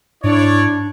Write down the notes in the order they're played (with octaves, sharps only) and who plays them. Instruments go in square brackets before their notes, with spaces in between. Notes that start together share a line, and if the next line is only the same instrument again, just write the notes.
[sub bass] G#2 [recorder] D4 [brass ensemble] E4 C#5 D5